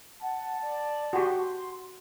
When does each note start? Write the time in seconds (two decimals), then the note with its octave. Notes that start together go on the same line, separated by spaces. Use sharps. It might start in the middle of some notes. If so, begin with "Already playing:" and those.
0.22 F#5 A5
0.62 D5
1.13 F#4 G4 C6